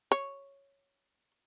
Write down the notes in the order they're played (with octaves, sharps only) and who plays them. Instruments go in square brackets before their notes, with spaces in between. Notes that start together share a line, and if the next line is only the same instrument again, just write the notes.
[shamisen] C#5